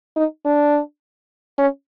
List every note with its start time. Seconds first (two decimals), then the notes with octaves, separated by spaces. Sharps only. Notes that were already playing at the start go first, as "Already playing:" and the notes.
0.16 D#4
0.45 D4
1.58 C#4